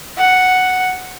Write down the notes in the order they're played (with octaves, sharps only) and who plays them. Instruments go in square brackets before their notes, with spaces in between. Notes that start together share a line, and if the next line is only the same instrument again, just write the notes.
[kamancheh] F#5